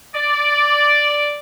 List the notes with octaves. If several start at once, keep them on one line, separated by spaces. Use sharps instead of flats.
D5